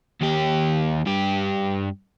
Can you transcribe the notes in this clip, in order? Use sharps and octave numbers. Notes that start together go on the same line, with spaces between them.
D#2 G4
G2 G4